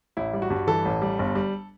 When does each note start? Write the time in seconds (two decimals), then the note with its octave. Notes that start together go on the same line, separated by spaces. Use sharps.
0.17 A1 E4
0.33 G3
0.42 F#4
0.50 G2
0.67 E3 A4
0.85 A1
1.02 G3
1.19 G1
1.35 G3